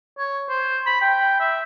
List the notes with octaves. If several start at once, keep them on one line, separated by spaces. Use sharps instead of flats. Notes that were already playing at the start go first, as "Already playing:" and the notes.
C#5
C5
B5
G5
E5